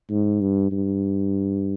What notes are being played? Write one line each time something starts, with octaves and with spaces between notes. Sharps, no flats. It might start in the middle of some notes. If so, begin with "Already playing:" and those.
G#2
G2
G2